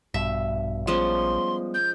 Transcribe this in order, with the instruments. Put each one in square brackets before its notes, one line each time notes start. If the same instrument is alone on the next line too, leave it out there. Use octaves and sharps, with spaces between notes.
[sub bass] A#1 [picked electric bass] G2 B2 [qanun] E5
[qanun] F3 G#3 C#4 [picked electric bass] G3 B3 [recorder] C6
[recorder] G6